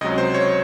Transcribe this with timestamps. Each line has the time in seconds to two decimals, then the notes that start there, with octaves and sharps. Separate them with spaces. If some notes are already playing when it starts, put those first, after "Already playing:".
0.01 C#2 C3 F#3 D#5
0.18 C5
0.34 C#5